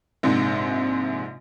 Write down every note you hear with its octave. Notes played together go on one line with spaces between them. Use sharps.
A#1 G#2 C3